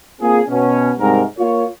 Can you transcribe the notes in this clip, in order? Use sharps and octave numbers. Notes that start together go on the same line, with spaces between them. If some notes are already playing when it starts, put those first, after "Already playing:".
A#3 C4 F4 G#4
B2 C#4
G#2 C3 G3 A#4
A#3 F4 A#4 C#5